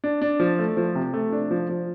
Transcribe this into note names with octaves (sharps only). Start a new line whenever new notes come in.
D4
D4
F3
A3
F3
C3
A3
D4
F3
F3